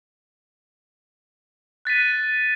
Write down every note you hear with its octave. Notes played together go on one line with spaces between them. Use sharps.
F#6 A6 B6 D#7